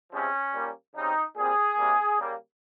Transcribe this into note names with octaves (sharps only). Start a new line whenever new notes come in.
C3 F3 G#3 C4 C#4
A#2 G3 A#3
C#3 G3 C4 D#4
A#2 G3 C4 G#4
C3 G3 A#3
C#3 G3 A#3